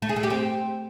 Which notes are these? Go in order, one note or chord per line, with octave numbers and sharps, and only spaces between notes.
A3
G#4
A3
G4
C4